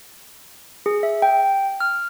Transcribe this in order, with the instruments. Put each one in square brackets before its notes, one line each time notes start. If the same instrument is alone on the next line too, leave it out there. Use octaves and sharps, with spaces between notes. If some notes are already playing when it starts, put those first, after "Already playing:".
[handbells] G#4
E5
G5
F6